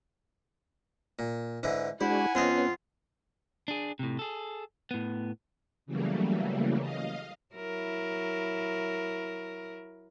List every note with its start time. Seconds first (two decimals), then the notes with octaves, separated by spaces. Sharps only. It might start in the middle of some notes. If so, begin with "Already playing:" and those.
1.19 A#2
1.63 G#2 D3 E3
2.01 G#3 D4 E4 F#4 C5 F#5 G#5
2.35 F2 B3 C#4 F4 C5 D#5
3.68 D4 G#4
3.99 A2 C3
4.19 G#4 A4
4.91 A2 B3
5.86 C#3 E3 F#3 G3 A3 A#3
6.80 D#5 F5
7.55 F#3 E4 A#4